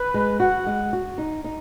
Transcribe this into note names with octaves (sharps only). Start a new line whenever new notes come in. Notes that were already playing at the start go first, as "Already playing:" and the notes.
Already playing: B4
G#3
F#4 F#5
G#3
F#4
D#4
D#4